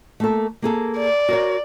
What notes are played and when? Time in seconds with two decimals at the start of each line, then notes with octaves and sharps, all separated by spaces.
0.20 A3 A#3 A4
0.62 A#3 G#4 A4
0.98 D5
1.29 F#4 A#4 C#5